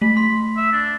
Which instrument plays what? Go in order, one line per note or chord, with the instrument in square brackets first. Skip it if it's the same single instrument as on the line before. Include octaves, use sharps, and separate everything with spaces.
[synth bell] A3 [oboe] B5
[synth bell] C6
[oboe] E5
D4